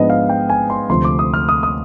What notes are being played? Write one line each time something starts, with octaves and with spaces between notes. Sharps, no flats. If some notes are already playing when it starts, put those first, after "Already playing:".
Already playing: G#2 F3 B3 D4 D#5
F5
G5
G#5
C6
D2 C3 F3 C6
D6
D#6
F6
D#6
D#6